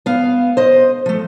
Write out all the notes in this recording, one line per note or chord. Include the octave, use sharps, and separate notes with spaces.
B3 F5
C5 D#5
F3 A3